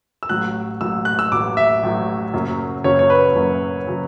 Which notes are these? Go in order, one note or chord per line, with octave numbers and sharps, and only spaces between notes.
E6
A1 A2 F#3 F#6
A1 A2 F#3 E6
F#6
E6
A1 A2 F#3 D6
E5
A1 A2 F#3
F#1 F#2 C#3 F#3
F#1 F#2 C#3 F#3 C#5
C#5
B4
F#1 F#2 C#3 F#3
C#3 F#3